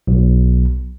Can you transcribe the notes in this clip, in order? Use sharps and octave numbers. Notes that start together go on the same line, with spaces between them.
B1